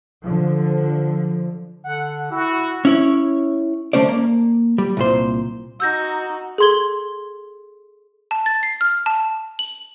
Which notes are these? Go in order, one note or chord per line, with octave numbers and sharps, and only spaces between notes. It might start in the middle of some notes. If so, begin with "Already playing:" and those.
D3 F3
D3 F#5
E4 F#4
C#4 E4 C#5
D3 A3 C#4 C5 D5
A#3
G3
C2 A#2 C5
D#4 F#4 E6 G6 A#6
G#4 A4 C6 G#6 G7
A5
A6
C7
F6
A5
F#7